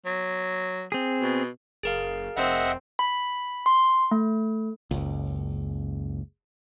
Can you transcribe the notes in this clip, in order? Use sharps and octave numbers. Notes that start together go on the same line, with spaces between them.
F#3
C4 G#4
B2
F#1 G#4 A#4 F5
F1 C4 D#5 E5 F#5
B5
C6
A3
F#1 C#2